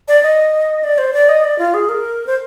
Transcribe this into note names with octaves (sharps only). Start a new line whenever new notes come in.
D5
D#5
D5
C5
D5
D#5
D5
F4
G#4
A#4
C5